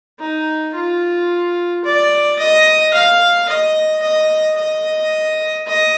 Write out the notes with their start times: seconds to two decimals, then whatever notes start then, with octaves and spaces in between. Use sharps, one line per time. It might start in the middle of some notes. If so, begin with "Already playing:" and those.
0.20 D#4
0.75 F4
1.84 D5
2.39 D#5
2.94 F5
3.49 D#5
4.03 D#5
4.58 D#5
5.67 D#5